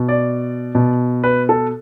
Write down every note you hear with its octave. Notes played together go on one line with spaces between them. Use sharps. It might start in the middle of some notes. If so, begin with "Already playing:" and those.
Already playing: B2
D5
B2
B4
A4